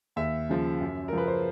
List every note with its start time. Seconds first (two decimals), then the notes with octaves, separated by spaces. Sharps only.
0.16 D#2 E5
0.49 C#3 F3
0.80 F#2
1.08 A#4
1.13 C#3 F3 B4
1.27 C5